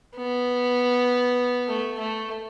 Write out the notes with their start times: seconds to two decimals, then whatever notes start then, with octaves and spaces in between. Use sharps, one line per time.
0.16 B3
1.68 A3
1.99 A3